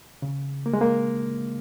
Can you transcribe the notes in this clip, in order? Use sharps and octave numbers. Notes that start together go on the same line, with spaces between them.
C#3
A#3
G#3
A#3